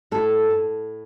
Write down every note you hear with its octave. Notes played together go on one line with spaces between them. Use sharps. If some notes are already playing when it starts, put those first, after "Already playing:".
A2 A4
A2